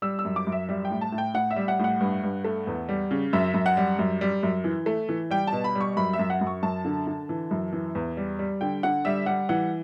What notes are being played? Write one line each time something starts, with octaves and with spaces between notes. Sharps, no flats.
G3 E6
E6
F#2
D6
F#2
E5
G3 E5
G5
A2
A5
A2
G5
A2 F#5
E5
G3
F#5
A2 F#5
G2
G2
A3
E2
G3
C#3
F#2 E5
F#2
F#5
G3
F#2
G3
F#2
E3
A3
E3
G3 G5
A5
B2
B5
G3
C#6
F#2 B5
E5
F#2
F#5
F#2
C#6
F#2 A5
D3
D3
E3
F#2
E3
E2
G3
G3
D3 G5
D3 F#5
G3 E5
G3 F#5
E3 F#5